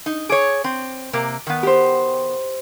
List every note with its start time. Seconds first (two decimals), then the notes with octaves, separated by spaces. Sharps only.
0.06 D#4
0.29 G#4 C#5 D6
0.64 C4
1.13 C3 A#3 D6
1.47 D#3 B3
1.63 G4 C5